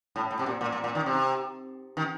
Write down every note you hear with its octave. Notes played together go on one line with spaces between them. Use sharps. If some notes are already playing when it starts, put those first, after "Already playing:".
A2
A2
C3
A#2
A#2
A#2
A#2
D#3
C3
D#3